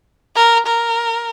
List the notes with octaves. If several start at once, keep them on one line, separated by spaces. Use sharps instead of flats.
A#4
A#4